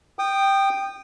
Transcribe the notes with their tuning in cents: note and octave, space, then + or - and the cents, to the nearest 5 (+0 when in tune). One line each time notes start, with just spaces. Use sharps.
G5 +0 D#6 -25